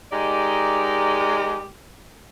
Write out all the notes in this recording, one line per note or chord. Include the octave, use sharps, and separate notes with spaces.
G#3 D#4 G4 A#4 D5 D#5